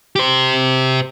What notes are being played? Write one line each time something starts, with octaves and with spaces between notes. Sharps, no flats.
G4 C5